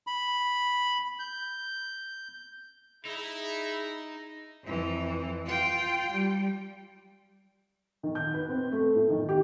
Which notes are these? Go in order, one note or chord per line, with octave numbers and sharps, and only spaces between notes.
B5
G6
D#4 E4 G#4
F2 E3
F4 G5
G3
D#3
G6
B4
C4
A3
A2
D#3
G4